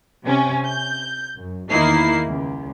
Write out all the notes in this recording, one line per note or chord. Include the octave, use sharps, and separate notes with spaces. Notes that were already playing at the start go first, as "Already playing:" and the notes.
C3 C#4
G6
F#2
E2 D#3 A#3 D#4 E4 C7
C#2